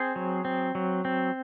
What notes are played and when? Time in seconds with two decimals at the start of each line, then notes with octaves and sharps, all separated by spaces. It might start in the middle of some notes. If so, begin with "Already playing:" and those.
Already playing: C4 G#4 C5
0.16 F#3
0.45 C4
0.75 F#3
1.05 C4